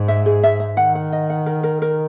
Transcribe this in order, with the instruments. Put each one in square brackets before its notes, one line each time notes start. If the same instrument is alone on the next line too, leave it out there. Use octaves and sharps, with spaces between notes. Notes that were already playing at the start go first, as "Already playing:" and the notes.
Already playing: [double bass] G#2
[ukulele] E5
G#4
E5
E5
[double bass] D#3 [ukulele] F#5
[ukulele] F#5
D#5
F#5
A#4
A#4
A#4